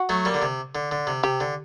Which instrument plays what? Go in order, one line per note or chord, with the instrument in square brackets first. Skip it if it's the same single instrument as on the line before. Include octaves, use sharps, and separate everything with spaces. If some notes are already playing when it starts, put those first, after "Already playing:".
Already playing: [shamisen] F#4
[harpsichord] F#3 A3
G3 A#3
D3
C3
D3
D3
C3
[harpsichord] C3 [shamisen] G4
[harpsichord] D3